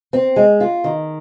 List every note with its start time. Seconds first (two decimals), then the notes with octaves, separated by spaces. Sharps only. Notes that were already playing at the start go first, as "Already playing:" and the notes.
0.13 C4
0.36 G#3
0.60 F4
0.84 D#3